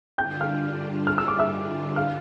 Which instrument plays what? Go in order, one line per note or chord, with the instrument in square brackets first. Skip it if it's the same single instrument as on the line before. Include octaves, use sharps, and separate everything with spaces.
[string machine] G2 D3 G3 D4 F4 [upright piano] G5 G6
[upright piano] F5 F6
F6
E6
D6
E5 E6
F5 F6